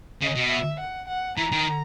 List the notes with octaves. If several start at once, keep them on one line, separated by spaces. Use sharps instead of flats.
C#3 D#5
B2
E5
F#5
F#5
E3 A#5
D#3